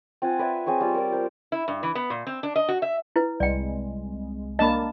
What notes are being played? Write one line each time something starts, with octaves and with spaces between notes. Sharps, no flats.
C4 F4 F#5 G#5
B4 D5 E5 G#5
C4 G#4 C#5 C#6
G3 F4
A#4 D5
A#4 C5
E4
G2
E3
B3
A#2
C4
D4
D#5
F#4
E5
E4 B4
C2 G#3 D5 G5
A#3 D4 D#5 A5 B5